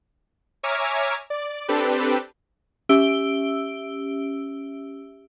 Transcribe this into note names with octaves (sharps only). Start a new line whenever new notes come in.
C#5 E5 G#5 A#5 D6 F6
D5
C4 D4 G4 A4 B4
C#4 G4 E5 E6 D7 G7